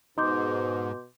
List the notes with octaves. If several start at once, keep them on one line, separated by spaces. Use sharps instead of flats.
G#2 B2 D#4 C6 D6 G6